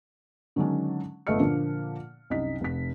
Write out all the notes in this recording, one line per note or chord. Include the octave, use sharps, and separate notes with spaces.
D3 D#3 F#3 G#3 C#4 D4
G1 A3 B3 D#5 F6 C#7
A#2 D3 F3 A#3 D4
C2 F#2 D#4 D#5 B6
F1 B6